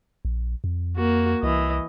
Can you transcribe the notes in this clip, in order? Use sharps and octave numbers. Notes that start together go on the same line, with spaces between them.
A#1
F2
A#3 F#4
C2 E3 D#5